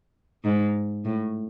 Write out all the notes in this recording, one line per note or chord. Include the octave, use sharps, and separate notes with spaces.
G#2
A2